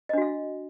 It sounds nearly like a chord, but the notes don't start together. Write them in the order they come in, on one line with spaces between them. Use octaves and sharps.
D#5 D4 F#4 F5